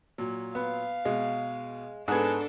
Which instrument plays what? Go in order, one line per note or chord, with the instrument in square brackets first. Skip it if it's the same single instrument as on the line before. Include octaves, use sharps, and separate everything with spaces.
[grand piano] A#2 F#3
[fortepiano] B3 [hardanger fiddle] F5
[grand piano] B2 [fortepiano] G#3
[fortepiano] G#2 B3 [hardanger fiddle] D4 A4 [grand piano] G#4 G#6